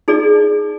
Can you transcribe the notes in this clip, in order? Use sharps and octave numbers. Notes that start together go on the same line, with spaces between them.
D#4 G#4 D5